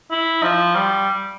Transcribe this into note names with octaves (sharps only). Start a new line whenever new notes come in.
E4
F3
G3